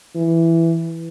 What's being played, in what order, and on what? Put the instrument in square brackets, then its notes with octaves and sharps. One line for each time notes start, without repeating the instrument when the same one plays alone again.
[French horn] E3